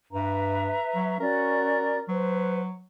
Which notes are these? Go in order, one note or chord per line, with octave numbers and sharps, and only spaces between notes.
G2 B4 E5 A#5
F#3
C#4 F#4 A#4 D5
F#3 B4 C5